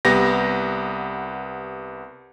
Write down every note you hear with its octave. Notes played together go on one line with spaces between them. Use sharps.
C2 B3 G4 A#6